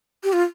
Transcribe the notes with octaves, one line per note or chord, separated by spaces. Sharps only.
G4
F4